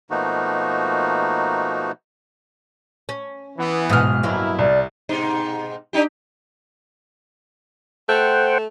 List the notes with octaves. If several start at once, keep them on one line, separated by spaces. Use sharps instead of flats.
B2 F3 A3 A#3 D#4 F#4
C#4
E3 B3
D1 G#2 B2 D#6 F6
G2 B2 F#3 A#3 E4
C2 D5
G#2 B2 D#4
D4 D#4 G4
A3 C5 F#5 G5